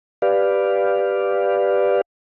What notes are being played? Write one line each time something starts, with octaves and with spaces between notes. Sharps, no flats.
G4 B4 D5 F5